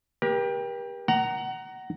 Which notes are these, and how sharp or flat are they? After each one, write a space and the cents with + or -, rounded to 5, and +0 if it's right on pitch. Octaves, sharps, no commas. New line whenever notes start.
G4 +20 A#4 +45
F#5 +25 A#5 +0